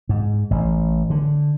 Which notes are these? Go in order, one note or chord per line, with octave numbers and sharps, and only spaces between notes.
G#2
A1
D3